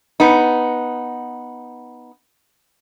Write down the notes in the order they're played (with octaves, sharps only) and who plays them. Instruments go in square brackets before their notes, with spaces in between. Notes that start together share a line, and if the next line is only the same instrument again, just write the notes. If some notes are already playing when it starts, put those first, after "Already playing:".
[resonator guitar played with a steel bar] B3 D#4